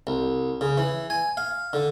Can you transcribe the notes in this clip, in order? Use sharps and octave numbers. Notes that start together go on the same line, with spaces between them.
C2
C#3
E3
G#5
F5
D3